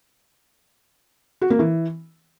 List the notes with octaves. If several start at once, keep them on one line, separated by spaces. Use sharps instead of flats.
F#4
A#3
E3